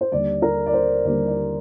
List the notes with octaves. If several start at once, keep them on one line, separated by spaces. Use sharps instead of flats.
C5
D#2 D3 G3 D5
A#4
D5
C5
D#2 D3 G3 D5
D5